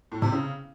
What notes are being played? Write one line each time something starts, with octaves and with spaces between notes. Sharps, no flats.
A2
C3
C#3